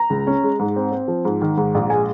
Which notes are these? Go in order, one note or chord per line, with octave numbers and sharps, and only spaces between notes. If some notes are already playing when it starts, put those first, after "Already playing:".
Already playing: A#5
C#2
C#4
G#3
G#2
C4
C4
F3
G#2
D#3
G#2
A#1
G#3 G#5